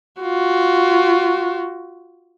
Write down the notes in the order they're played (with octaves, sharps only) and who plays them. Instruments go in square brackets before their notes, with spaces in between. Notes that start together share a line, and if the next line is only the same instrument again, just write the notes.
[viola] F4 F#4